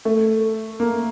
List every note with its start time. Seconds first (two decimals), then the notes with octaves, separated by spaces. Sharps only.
0.05 A3
0.80 A#3